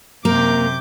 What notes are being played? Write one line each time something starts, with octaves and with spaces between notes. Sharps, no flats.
F#2 C3 A#3 A#4 D6 G6